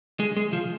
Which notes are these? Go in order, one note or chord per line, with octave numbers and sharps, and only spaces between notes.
G#3
G#3
F3